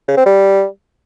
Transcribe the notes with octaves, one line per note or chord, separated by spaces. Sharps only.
C#3
C4
G3